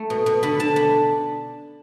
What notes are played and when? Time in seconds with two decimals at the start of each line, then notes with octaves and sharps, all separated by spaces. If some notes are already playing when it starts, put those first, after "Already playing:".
Already playing: A3
0.10 B2
0.26 B2
0.43 D3 B5
0.59 D3 A5
0.76 D4 B5